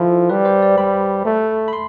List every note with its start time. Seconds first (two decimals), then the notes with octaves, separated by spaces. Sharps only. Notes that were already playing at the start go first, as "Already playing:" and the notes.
Already playing: F3 E4 F4 A4
0.29 G3 B4
0.45 C5
0.62 D5
0.78 G3 B5
1.25 A3
1.68 B5
1.73 C6